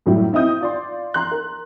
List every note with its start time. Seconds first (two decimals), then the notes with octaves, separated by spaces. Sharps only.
0.06 F#2 A2 F#3 G3 E4
0.33 C4 E4 D#5 D#6 G6
0.61 F4 D5 C6
1.14 A#5 C6 F#6
1.31 A#4